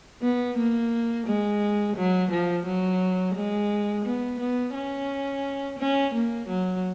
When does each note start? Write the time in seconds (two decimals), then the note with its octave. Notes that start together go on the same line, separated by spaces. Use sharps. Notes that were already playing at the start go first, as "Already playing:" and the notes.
0.22 B3
0.58 A#3
1.27 G#3
1.96 F#3
2.31 F3
2.66 F#3
3.35 G#3
4.05 B3
4.40 B3
4.75 C#4
5.79 C#4
6.14 A#3
6.49 F#3